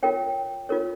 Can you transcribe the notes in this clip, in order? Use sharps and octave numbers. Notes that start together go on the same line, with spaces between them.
F4 A#4 C#5 G5
F4 A#4 C#5